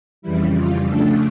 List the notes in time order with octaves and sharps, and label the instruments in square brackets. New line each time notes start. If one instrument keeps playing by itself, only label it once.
[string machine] F2 C#3 E3 G3 E4
F4
C#3 F3 A3 D4 A4